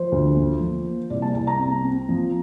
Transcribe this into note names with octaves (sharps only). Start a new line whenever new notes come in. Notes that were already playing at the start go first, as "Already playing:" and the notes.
Already playing: F3 C5
D2
F3
F3
A#3
C2 D5
A5
C2 A5
A#5
C4
C4
F3